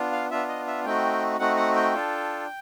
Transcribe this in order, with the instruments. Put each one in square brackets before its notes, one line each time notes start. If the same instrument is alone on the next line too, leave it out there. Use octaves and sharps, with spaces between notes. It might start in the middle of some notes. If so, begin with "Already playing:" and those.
Already playing: [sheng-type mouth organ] B3 D4 F4
F5
B3 D4 F4 E5
D#5
E5
A3 C4 D#4 F#4 G5
A3 C4 D#4 F#4 F#5
F#5
G5
D4 F4 A4